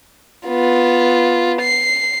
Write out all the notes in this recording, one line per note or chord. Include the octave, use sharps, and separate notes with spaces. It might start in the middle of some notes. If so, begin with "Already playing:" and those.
B3 F4
C7